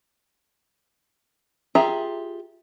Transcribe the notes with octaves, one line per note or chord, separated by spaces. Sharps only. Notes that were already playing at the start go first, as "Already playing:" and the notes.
F4 G4 G#4 E5 A#5